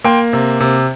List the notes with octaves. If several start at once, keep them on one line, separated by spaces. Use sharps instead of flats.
A#3 G5 C6
C3
C3